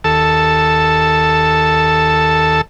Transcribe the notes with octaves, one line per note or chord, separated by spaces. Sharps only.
D#2 A4 A5 E6